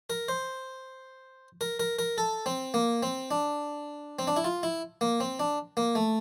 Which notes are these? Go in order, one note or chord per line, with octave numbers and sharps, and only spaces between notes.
A#4
C5
A#4
A#4
A#4
A4
C4
A#3
C4
D4
C4
D4
E4
F4
E4
A#3
C4
D4
A#3
A3